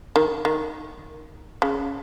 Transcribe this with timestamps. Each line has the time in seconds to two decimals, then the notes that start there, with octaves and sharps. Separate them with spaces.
0.16 D#3
0.45 D#3
1.62 C#3